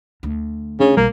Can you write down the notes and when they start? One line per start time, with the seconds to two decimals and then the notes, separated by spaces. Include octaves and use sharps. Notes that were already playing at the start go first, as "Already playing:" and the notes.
0.23 D2
0.80 C#3 D4
0.97 B1 G3 A#3